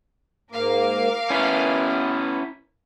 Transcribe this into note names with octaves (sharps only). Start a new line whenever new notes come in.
G#2 A#3 A#4 F5 D6
B3 C#4 E4 B4